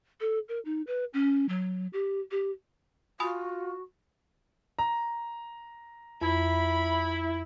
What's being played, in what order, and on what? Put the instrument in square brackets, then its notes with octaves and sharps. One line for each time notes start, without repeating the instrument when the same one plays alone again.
[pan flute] A4
A#4
D#4
B4
C#4
F#3
G4
G4
[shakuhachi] F4 [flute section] F#4 [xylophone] G#5 B5 D#6
[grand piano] A#5
[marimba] F2 [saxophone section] E4 [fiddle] B5